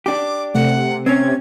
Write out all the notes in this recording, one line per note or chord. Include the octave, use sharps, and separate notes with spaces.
D4 G4 D6
C3 A3 F#5
C4 C#4 G#6